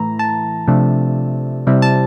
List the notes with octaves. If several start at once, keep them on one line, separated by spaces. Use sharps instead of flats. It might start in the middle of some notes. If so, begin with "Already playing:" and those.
Already playing: A2 E3 A3 E4 A#5
A5
C3 F3 A3 D4
C3 G3 C4 E4
A5